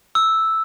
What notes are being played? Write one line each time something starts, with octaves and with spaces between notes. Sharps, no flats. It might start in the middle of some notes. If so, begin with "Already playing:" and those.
E6